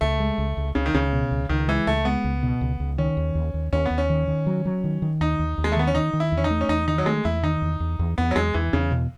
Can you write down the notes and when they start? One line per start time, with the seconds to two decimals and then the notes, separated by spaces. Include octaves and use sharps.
0.01 C#2 A3
0.20 G#3
0.38 C#2
0.57 C#2
0.75 C#2 C#3
0.86 D#3
0.94 C#2 C#3
1.12 B2
1.31 C#2
1.49 C#2 D#3
1.68 E3 G#3
1.87 C#2 A3
2.05 G#3 B3
2.24 C#2
2.43 B2
2.61 C#2
2.80 C#2
2.98 D#3 C#4
3.17 D#2
3.35 D#2
3.54 D#2
3.73 D#2 C#4
3.86 D#2 B3
3.98 C#4
4.10 D#3
4.28 D#3
4.46 F#3
4.65 F#3
4.84 D#3
5.02 D#3
5.21 D#2 D#4
5.39 D#2
5.58 D#2
5.64 G#3
5.72 A3
5.76 D#3 B3
5.87 C#4
5.95 D#3 D#4
6.13 D#3
6.20 E4
6.32 E2
6.38 C#4
6.44 D#4
6.50 A3
6.61 C#4
6.69 E2 D#4
6.88 D#3 D#4
6.98 F#3
7.06 G#3 A3
7.25 E2 E4
7.43 D#3 D#4
7.62 E2
7.80 E2
7.99 E2
8.18 E2 B3
8.31 F#3
8.36 E2 G#3
8.54 E2 E3
8.73 E2 C#3
8.91 B2